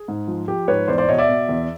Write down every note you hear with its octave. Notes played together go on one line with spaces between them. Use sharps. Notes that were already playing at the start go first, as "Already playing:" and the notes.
Already playing: G#4
G#2
F3
F3 G4
G#2 B4 C#5
E2 C5 D5
C5 D5
B2 C#5 D#5
D5 E5
B2
E2